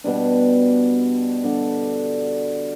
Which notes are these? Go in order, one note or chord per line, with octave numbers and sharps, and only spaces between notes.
B2 G3 D4
D3 G3 D4